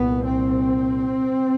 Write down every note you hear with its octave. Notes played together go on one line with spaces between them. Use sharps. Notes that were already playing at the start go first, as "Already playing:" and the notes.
Already playing: C2 A#2 B3
C4